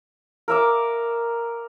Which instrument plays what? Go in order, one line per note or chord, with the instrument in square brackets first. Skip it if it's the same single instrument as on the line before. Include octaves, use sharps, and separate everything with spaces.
[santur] A#4 E5 D6